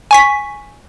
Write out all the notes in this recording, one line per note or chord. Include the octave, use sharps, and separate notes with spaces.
G#5 C#6 B6